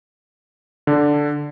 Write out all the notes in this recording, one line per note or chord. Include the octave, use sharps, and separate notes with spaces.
D3 D4